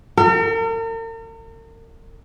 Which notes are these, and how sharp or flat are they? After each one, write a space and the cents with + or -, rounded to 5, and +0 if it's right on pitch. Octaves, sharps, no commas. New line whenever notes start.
A#4 -45